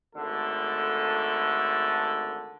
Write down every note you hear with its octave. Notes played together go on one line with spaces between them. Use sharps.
G#1 D3 A3 A4